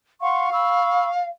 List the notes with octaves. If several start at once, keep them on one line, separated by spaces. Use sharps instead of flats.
F5 F#5 C6 C#6
B5 C#6 E6